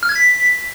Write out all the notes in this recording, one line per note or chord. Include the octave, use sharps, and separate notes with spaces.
F6
G#6
B6